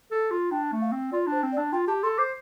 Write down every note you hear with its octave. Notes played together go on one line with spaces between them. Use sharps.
A4
F4
D4 G5
A3
F5
C4
F4 D5
D4
C5
C4
D5
D4
F4 G5
G4 A5
A4 C6
C5 D6